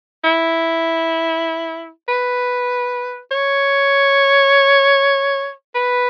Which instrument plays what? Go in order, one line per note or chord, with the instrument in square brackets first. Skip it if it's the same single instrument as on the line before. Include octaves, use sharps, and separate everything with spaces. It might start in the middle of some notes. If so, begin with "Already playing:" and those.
[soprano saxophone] E4
B4
C#5
B4